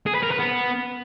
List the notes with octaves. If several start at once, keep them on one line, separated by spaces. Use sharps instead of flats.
G#4
B4
A#4
B4
B3